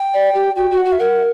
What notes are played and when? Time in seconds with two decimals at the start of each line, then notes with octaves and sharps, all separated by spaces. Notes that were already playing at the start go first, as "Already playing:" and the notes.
Already playing: G5
0.14 D5
0.34 G4
0.56 F#4 G5
0.71 F#4
0.77 F#5
0.85 F#4
0.92 E5
0.99 A#4 F#5